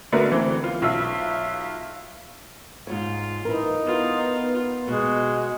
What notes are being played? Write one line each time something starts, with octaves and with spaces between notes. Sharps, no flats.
D3 A3 B3 F#4 A#4
E3 C4
F4
B1 F4 E5 E6
G#2 C3 F4 C#5
E3 D#4 E4 A#4
B3 F4
B2 G#3 F#4